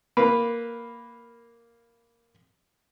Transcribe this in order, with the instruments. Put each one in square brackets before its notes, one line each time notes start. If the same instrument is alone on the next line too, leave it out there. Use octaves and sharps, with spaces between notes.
[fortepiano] A#3 B4